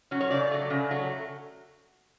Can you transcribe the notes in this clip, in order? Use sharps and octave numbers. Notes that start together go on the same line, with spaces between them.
F#3 C#4
C#5
C#3 D5
F#3 A3
C#3
F#3 A3